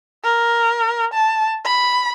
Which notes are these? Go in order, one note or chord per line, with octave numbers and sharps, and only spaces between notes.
A#4
A5
B5